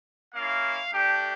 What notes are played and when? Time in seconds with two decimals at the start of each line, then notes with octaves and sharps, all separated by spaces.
0.34 A#3 C#4 E4 F5
0.92 A3 D4 G4